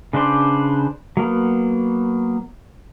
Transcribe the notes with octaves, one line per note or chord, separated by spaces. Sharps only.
C#3 D4 B4 C5 D5
F#3 A#3 B3